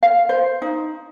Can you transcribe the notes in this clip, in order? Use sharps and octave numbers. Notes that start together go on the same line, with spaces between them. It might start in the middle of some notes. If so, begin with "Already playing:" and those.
F5
C5
D#4